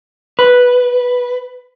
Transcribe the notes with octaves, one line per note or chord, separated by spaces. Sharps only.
B4